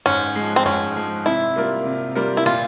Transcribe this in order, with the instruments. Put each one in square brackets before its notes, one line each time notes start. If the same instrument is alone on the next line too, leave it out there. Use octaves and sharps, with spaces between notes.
[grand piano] G#2 [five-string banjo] C#4
[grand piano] F3 G#3
[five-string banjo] C4
[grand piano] G#2 [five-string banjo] C#4
[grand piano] F3 G#3
[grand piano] C3 [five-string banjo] E4
[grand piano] G3 A#3 F4 A#4
C3
G3 A#3 F4 A#4
[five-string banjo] E4
[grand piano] A#2 [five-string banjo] F4